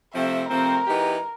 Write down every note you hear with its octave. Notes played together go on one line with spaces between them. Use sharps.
C3 F3 A3 C4 E5
C3 F3 A3 C4 A#4
E3 G#3 B3 D#4 G4